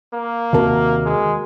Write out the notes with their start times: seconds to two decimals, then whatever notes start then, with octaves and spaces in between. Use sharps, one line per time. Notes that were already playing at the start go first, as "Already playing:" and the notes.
0.14 A#3
0.53 D#2 C3 F#4 A#4 A5
1.06 G#3